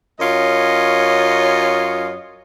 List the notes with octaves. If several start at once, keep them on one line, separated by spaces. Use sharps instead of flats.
F#2 C#4 F4 C#5 D#5